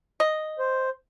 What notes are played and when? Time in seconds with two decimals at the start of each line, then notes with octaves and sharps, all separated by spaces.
0.20 D#5
0.59 C5